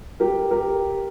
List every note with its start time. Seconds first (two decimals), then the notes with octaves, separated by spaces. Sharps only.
0.20 G4 A#4
0.51 G4 A#4